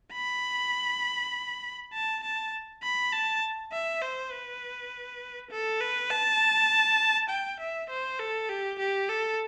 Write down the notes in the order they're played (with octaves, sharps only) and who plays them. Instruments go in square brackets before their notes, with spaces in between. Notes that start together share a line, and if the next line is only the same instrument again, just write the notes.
[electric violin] B5
A5
A5
B5
A5
E5
C5
B4
A4
B4
A5
G5
E5
C5
A4
G4
G4
A4